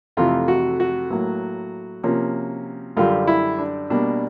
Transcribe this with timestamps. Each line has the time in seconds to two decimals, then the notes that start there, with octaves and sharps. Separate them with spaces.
0.17 F2 C3 E3 A3 F4
0.48 F#4
0.80 F#4
1.11 A2 F#3 A#3
2.03 C3 F3 A#3 C#4
2.97 F#2 D3 G3 F4
3.27 E4
3.59 D4
3.90 B2 G3 A#3 D4